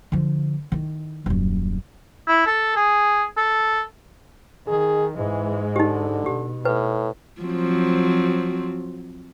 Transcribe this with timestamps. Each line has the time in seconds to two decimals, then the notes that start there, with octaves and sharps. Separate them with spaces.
0.12 D3 F3
0.72 D#3 E4
1.26 D#1 F#2
2.28 E4
2.47 A4
2.76 G#4
3.37 A4
4.67 D#3 G#4
5.17 G#2 E3 G#3
5.76 D3 D#4 G4
6.26 B2 G4
6.65 A2 B4
7.42 F3 F#3 C4